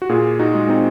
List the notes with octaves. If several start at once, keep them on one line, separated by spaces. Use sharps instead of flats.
F#4
A#2 F4 G#4
D#4 F#4
G#3
C4 D#4